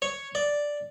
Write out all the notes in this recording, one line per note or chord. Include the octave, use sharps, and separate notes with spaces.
C#5
D5